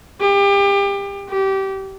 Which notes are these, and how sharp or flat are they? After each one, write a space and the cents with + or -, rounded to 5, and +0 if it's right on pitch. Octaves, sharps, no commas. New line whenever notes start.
G4 +30
G4 -20